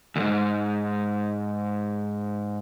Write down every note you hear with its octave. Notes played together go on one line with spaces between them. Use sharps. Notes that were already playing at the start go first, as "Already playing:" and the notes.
D2 G#2